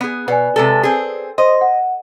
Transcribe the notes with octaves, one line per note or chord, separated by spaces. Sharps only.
B3 G#4
B2 B4 D5 F#5 G#5
C3 G#3 A4
C4 G#4
C5 D#5 C6
F#5